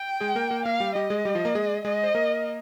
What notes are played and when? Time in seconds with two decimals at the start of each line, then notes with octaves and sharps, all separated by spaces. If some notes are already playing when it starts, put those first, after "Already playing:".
Already playing: G5
0.21 G#3 G#4
0.35 A#3 A#4
0.50 A#3 A#4
0.65 A#3 A#4 F5
0.80 G3 G4
0.95 G3 G4 D#5
1.10 G#3 G#4
1.25 G3 G4
1.35 F3 F4
1.45 A#3 A#4
1.55 G#3 G#4
1.85 G#3 G#4 D#5
2.03 C5
2.15 A#3 A#4